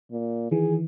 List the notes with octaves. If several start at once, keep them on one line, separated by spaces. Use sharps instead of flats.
A#2
D#3 E3 G#4